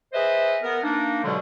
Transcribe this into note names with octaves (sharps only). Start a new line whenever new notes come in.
G#4 B4 C5 D#5 E5
B3 A#4
A#3 D4 D#4
G2 B2 D3 F#3 G#3